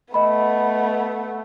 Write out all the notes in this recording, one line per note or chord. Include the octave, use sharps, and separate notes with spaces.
A3 B3 D#5 B5